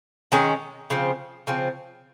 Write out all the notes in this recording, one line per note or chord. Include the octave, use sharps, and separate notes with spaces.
D#3 G#3 C#4
C#3 F3 C4
C#3 F3 C4